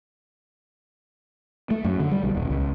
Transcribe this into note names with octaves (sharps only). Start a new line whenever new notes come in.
A3
F#2
D3
G3
B1
D#1
C#2